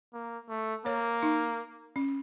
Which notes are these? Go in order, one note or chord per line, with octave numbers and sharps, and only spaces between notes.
A#3
A3
A#3 C#5
D#4
C#4